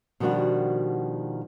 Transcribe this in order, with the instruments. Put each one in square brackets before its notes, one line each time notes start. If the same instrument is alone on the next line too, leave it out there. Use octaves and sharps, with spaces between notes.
[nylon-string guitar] B2 D#3 F3 G3 D4 F#4